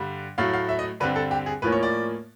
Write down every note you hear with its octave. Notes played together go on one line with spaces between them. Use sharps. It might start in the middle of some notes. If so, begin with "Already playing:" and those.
Already playing: G2 D3 G3
A2 F#3 A3 F5
F5
E5
D#5
G2 D3 G3 C4 B4
A4
G4
G#4
A2 F3 A#3 C#4 B4
C#5
D5